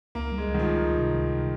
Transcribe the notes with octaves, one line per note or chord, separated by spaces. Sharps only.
C#2 A#3
G3
G#3
C#2
D#3
F3
C#2
C#2
C3
C#2
C3